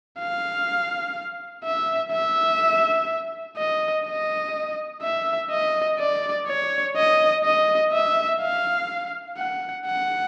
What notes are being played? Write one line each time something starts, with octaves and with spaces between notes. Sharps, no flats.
F5
E5
E5
D#5
D#5
E5
D#5
D5
C#5
D#5
D#5
E5
F5
F#5
F#5